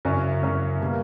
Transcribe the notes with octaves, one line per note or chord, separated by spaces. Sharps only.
F#2 C#3 F#3 C#4 E4
F#2 C#3 F#3 C#4 E4
B2 G3 A#3